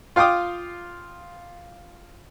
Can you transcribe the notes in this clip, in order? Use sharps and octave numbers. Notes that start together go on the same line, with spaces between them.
F4 F5 G5 D6 D#6